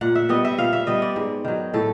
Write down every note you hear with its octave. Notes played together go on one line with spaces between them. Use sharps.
A#2 F#5
E5
G3 B3 D#5
E5
A#2 F5
E5
G3 B3 D#5
D5
G#2
D#3 F#3
A2 A4